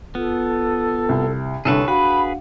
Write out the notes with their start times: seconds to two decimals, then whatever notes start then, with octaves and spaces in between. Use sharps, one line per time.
0.15 B3 F4 A4
1.09 C2
1.65 C2 D3 G#4 A4 B4 C#5 C#6
1.88 D4 F#4 G#4 B4 F5 F#5 B5